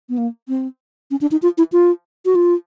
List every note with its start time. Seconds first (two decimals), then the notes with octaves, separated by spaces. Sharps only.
0.09 B3
0.18 A#3
0.49 C4
1.11 C#4
1.21 D4
1.31 D#4
1.42 F4
1.58 E4
1.72 F4
2.25 F#4
2.35 F4